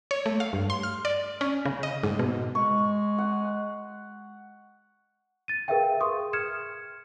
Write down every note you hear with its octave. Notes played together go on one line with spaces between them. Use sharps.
C#5
A3
F5
G2
C6
F6
D5
C#4
C#3
D#5
G#2
B2
G#3 C#6
F#5
A6 D#7
G#4 A#4 B4 E5 F5 G5
G#4 C6 C#6 D#6
F6 G#6 C#7 E7